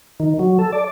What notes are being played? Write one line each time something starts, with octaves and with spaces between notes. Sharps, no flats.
D#3
F#3
A4
D5